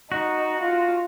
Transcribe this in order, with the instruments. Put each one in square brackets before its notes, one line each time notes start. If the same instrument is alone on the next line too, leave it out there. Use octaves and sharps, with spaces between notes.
[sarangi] D#4 [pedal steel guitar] F#4
[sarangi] F4